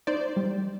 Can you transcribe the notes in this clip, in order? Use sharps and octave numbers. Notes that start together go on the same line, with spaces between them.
D#4 C5 D5
G3